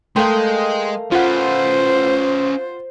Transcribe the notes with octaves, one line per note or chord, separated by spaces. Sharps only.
G#3 A3 A#4 F5 G5 C6
C#4 F4 B4 C5 F#5